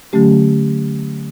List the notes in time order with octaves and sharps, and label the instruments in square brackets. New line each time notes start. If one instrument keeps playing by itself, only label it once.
[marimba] D3 F#3 A3 C#4 G4